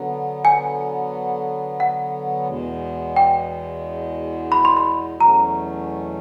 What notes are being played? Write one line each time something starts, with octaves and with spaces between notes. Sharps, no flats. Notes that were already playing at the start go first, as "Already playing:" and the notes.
Already playing: D3 F#3 B3
G#5
F#5
E2 B2 G#3
G5
B5
C6
B5
E2 B2 F#3 A3 C#4 A#5